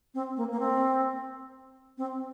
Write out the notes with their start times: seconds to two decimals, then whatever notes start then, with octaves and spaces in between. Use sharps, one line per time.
0.14 C4
0.37 A#3
0.52 A#3
0.60 C4
1.98 C4